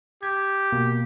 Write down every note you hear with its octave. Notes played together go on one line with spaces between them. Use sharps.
G4 G#6
B2 A#3